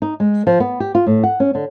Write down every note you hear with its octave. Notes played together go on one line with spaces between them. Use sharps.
D#4
G#3
F3
B3
G4
F4
A2
F#5
C#4
D3